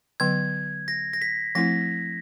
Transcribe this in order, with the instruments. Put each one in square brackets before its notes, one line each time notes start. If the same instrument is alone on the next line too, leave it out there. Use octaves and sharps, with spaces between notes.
[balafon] D3 F#3 B3 [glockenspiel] G#6
[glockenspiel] A#6
A#6
B6
[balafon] F3 A3 C4 E4 [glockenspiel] A#6